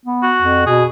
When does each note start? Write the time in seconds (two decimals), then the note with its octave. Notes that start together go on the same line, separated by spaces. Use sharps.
0.05 B3
0.23 F#4
0.42 F2
0.67 B2 G#4